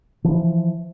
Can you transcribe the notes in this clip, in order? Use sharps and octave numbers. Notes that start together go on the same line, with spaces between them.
E3 F3